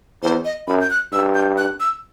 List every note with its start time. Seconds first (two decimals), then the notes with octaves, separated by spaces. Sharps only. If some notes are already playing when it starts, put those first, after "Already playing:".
0.23 E2 C5
0.45 D#5
0.67 F#2 B5
0.81 G6
0.90 F#6
1.13 G2 E6
1.35 G6
1.58 F#6
1.80 E6